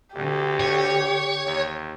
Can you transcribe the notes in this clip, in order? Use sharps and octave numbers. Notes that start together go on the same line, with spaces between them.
D2 D3 G4
C#5
D#2